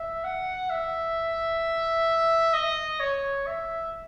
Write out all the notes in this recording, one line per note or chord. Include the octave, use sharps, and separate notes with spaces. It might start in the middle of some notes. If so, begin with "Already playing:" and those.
Already playing: E5
F#5
E5
D#5
C#5
E5